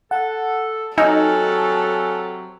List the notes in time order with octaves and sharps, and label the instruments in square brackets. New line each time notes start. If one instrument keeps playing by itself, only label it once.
[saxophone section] A4 [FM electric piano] F#5
[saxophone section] C3 F#3 [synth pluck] D#4 [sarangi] A4 [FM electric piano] G#5 E6 F6